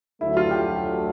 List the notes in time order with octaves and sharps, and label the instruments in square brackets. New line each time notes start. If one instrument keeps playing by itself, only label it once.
[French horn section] D2 D3 F#3 A3 [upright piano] E4
[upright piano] F4
G4